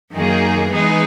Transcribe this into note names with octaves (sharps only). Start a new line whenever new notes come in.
F#2 D#3 A#3 D#4 G#4
E3 G#3 B3 D#4 G#4